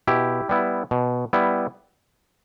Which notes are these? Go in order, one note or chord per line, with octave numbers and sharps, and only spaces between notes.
B2 E4 G4
G3 B3 E4
B2
G3 B3 E4